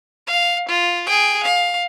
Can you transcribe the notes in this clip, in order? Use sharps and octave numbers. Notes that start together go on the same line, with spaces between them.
F5
F4
G#4 G5
F5